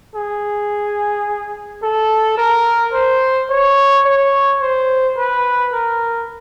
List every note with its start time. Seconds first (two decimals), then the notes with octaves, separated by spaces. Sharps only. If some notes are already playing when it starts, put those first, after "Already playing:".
0.15 G#4
1.82 A4
2.38 A#4
2.93 C5
3.50 C#5
4.05 C#5
4.61 C5
5.17 B4
5.72 A#4